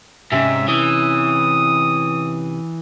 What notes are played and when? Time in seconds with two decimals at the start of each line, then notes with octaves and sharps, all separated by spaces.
0.32 G#2 C3 C#4 E5
0.68 E3 D#6